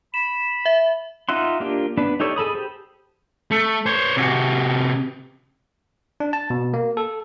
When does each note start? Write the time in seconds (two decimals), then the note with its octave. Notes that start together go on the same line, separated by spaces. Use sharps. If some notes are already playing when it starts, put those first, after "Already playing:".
0.14 B5 E7
0.66 E5
1.29 D#4 F4 E5 F#5 C6
1.60 A#3 D4 F4 G4
1.97 B3 D4 B4
2.20 D#4 G4 A4 C#5 D5
2.36 G#4 A4 B5 D#6
2.55 G4 C5
3.51 A3
3.86 C5 C#5
4.17 C3 F#4
6.20 D4
6.33 A5
6.50 B2
6.74 A#3
6.97 A4